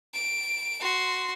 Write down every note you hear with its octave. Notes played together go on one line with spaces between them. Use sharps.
D7
F#4 C6